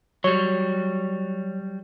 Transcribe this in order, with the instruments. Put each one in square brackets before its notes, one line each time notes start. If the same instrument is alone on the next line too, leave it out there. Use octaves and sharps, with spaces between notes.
[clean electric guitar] F#3 G3 [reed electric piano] C#5